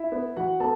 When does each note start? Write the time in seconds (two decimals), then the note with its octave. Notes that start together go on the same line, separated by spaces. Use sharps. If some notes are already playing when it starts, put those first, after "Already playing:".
Already playing: E4 E5
0.12 B3
0.37 E3 F#4 F#5
0.60 B3 A4 A5